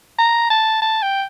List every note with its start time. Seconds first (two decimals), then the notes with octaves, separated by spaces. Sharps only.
0.18 A#5
0.50 A5
0.82 A5
1.02 G5